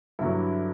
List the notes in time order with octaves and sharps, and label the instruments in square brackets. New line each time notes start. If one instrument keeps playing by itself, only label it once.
[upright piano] G2 D3 F#3 E4